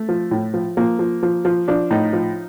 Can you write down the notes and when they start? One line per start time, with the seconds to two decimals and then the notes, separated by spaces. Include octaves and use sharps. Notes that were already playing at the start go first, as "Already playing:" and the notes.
Already playing: A3
0.09 F3
0.31 A2
0.54 F3
0.77 F3 A#3
0.99 F3
1.23 F3
1.45 F3
1.68 F3 D4
1.91 A2 D#4
2.13 F3